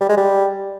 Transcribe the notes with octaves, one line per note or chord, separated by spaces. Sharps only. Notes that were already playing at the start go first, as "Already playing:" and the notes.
G3
G#3
G3